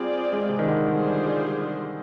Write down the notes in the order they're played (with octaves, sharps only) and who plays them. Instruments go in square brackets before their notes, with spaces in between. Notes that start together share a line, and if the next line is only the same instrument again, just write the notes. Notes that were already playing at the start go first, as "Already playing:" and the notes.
Already playing: [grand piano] G3 [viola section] C4 F4 G#4 D5
[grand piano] G#3
C3
D#3
D3
[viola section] G3 D4 F4 G#4 C5